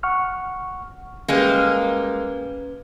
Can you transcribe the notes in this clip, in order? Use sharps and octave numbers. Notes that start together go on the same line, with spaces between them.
F#5 C#6 F6
G3 G#3 A#3 C#4 B4